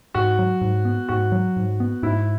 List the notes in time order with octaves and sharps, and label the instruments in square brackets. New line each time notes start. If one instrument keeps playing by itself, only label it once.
[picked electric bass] G#2 [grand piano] F#4
[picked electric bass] F#3
G#2
B3
[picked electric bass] G#2 [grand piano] F#4
[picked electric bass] F#3
G#2
B3
[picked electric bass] G#2 [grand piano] E4